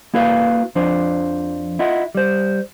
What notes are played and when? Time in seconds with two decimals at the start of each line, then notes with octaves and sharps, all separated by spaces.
0.14 A#3 E4 F#4 B4 F5
0.75 F2 F3 D4 C5
1.79 E4 F4 D#5 F#5
2.15 G3 C5